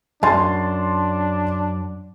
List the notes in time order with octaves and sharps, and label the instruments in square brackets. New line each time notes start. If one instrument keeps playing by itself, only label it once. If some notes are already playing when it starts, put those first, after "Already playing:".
[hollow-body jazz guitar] F#2 [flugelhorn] D4 [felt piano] A5 C6 A6